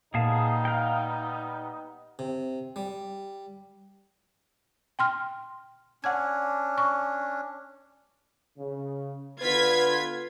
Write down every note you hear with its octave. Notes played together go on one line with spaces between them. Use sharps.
A#2 G3 B3 D#4 G#4 F5 A5
F5 G5
C3
G3
G5 C6 F6
C#4 D4 F#5 G#6
C#6
C#3
D3 B3 F4 B4 G#6 B6